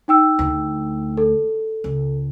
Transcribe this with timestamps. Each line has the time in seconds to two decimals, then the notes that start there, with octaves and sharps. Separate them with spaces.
0.08 D#4 G5 E6
0.39 D2
1.17 A4
1.84 C#2